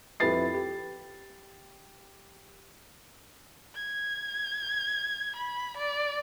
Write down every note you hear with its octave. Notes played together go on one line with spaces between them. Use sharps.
F2 E4 G4 B4 A6 C7
G4
G#6
B5
D5